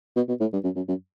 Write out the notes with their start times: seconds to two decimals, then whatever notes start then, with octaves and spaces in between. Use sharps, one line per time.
0.16 B2
0.28 B2
0.41 A2
0.53 G2
0.64 F#2
0.76 F#2
0.88 F#2